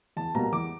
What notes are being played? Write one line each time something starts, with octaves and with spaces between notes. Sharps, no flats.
E2 A5
B2 G3 A#3 A#5
E2 D6